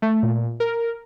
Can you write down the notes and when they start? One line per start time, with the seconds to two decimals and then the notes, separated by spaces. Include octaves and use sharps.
0.02 A3
0.23 A#2
0.60 A#4